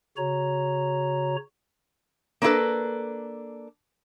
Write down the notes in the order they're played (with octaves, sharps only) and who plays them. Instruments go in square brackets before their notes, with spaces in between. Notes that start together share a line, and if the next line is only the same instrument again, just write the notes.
[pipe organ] C#3 F#4 C#5 A#5
[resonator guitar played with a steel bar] A#3 C#4 D4 E4 A4 B4